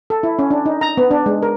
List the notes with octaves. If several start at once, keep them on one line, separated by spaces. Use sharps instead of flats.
A4
E4
C#4
D4
D#4
A#5
B3
D4
G#3
A#4